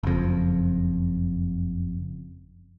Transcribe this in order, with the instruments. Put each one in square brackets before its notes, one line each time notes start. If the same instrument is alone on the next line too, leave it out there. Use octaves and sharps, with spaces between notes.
[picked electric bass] F#1 F2